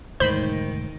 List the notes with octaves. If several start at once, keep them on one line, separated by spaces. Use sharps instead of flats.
E1 D2 G#2 D#3 C5 B5